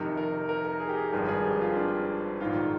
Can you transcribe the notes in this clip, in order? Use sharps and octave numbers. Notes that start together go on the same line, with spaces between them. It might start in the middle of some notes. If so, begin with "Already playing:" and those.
Already playing: F2 C3 D#3 A#4
A#4
A#4
A#4
G#4
G4
G#4
G#1 G2 F3 A#4
G#4
G4
F4
C4
D4
A#1 G#2 D#3 F4